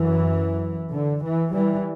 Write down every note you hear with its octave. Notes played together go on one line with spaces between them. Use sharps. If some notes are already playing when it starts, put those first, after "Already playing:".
Already playing: F#2 E3
D3
E3
E3 G3